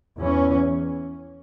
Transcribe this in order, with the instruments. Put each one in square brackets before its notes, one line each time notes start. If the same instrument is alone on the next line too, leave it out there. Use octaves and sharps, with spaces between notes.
[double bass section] E2 E3 C#4